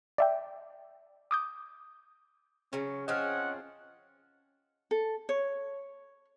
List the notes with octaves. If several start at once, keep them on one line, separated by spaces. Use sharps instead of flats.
D5 E5 G5
D6 D#6 G6
C#3 F#3 C#4
F3 C4 G#4 D#5 F#5 F6
A4
C#5